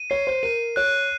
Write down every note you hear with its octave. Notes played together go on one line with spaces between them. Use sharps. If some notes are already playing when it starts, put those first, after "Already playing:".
Already playing: D#7
C#5 C7
C5
A#4 D#7
C#5 F#6